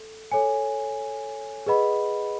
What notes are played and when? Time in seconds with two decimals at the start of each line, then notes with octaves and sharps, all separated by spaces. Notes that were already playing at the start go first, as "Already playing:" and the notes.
Already playing: A4
0.32 A4 C#5 G#5
1.66 G#4 B4 D#5 F#5 B5